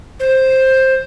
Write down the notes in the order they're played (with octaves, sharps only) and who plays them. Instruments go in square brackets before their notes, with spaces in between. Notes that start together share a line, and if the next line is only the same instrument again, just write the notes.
[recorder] C5